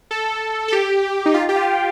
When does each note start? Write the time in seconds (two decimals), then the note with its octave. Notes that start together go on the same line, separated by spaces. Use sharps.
0.11 A4
0.68 A4
0.72 G4
1.26 D#4
1.34 F4
1.49 G4
1.56 F4
1.65 G4